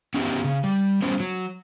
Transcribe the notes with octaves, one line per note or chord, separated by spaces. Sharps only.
B3 C#4 D#4 G4 E5
C#3
G3
G3 B3 C#4 C5
F#3